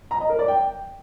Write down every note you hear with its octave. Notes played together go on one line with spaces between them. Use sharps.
A#5
D#5
A#4
D5
G5